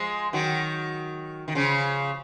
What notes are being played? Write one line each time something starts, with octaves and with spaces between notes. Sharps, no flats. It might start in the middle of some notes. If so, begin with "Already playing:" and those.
Already playing: F3 G#3
D#3 F#3
D#3
C#3 F3